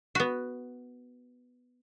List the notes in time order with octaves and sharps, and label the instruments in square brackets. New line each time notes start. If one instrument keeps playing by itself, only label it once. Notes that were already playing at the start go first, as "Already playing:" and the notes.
[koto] B3 F#4